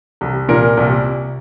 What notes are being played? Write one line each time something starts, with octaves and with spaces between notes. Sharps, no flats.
C2
A#2 A#4
C2